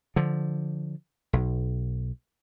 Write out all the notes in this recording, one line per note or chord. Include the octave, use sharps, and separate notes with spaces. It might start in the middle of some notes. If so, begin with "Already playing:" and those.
D3 F3
B1